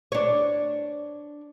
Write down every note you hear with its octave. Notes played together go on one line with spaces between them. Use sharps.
D4 C#5